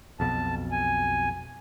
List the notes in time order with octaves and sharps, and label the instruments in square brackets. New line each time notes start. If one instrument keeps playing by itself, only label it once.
[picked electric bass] B1 F2 B2 [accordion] A5
[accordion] G#5